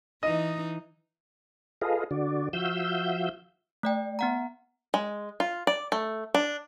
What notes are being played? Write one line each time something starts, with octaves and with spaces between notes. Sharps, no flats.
E3 D#4 D#5
F4 G#4 A4 B4 D#5 F5
D3 F#4 D5
F3 F#4 E5 F5 E6 G6
A3 D5 G5
B3 F#5 A#5
G#3
F4
D5
A3
D4